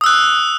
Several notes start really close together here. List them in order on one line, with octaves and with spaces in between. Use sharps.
D#6 E6 F#6